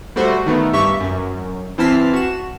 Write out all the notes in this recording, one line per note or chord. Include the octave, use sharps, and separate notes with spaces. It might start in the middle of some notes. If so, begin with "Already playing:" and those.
G3 A3 F#4 C5
D#3 A3 B3
G2 G4 E5 C#6 B6
F#2
E3 C4 A5 F6 B6 C7
F#4 E7